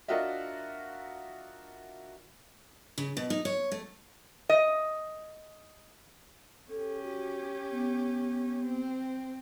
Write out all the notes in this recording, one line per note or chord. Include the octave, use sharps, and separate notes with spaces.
D4 F4 F#4 A#4 D#5 E5
C#3
B2
D#4
C#5
A3
D#5
C#4 G4 A4
F#4
B3
C4